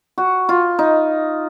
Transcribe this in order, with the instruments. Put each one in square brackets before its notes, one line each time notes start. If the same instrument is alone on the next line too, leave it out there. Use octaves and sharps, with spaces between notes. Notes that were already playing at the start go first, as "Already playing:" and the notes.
[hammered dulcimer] F#4
F4
D#4